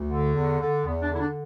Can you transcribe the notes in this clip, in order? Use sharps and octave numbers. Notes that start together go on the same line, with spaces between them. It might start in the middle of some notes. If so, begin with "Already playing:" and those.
Already playing: D2
D3
E2
D3
E2 B3
D4
D3 E4
D4